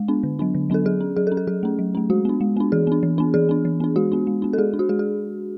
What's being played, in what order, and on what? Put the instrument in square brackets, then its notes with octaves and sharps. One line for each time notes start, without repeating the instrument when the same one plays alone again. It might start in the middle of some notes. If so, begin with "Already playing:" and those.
Already playing: [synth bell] G#3
B3 D4
D3
F#3 B3 D4
D3
F#3 B3 D4 A4
F#3 G#4
C#4
F#3 G#4
A4
C#4
A4
F#3 G#4
A3 C#4
F#3
A3 C#4
G#3 F#4
B3 D4
G#3
B3 D4
E3 G#4
B3 D4
E3
B3 D4
E3 G#4
B3 D4
E3
B3 D4
G#3 F#4
B3 D4
G#3
B3 D4
A4
G#3 G#4
D4
F#4
G#3 G#4
G#4